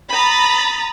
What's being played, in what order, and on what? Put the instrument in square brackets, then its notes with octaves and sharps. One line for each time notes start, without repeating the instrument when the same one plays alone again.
[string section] A#5 B5 D#6 A6